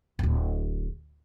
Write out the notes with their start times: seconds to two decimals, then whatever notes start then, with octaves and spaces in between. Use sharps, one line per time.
0.19 D1 G1